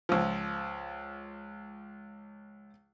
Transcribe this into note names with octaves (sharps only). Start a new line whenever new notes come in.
C#2 F3